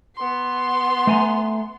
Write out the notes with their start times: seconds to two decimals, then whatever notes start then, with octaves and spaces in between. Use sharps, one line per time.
0.15 B3 C6
1.07 A3 G#5 A#5